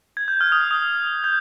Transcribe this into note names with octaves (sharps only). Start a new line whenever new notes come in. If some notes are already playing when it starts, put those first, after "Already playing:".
G#6
G6
F6
D#6
F6
D#6
F6
G6